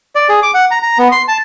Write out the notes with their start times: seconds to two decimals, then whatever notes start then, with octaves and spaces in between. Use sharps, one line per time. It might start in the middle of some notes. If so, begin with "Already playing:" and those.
0.16 D5
0.29 G#4
0.43 D6
0.54 F#5
0.71 A#5
0.83 A#5
0.98 B3
1.12 C6
1.28 A5